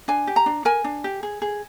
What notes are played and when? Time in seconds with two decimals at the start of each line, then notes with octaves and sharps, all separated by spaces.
0.08 D4 G#5
0.27 G4
0.36 A#5
0.46 D4
0.65 A#4 G#5
0.84 D4
1.04 G4
1.23 G#4
1.42 G#4